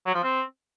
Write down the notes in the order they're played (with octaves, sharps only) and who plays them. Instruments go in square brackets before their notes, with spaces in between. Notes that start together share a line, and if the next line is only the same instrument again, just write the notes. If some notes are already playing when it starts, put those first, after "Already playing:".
[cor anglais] F#3
F3
C4